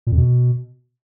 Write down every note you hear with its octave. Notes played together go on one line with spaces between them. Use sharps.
A#2
F2
B2